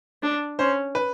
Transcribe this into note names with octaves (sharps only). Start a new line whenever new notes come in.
D4
C#4 C5
B4